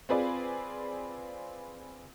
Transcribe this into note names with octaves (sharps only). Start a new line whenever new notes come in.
C4 F4 G#4 B4 D5